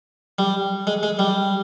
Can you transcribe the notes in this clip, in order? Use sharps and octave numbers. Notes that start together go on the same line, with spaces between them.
G3
G#3
G#3
G3